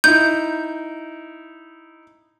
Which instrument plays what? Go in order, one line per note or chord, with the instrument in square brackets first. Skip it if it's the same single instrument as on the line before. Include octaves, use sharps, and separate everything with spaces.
[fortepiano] D#4 E4 [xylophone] G6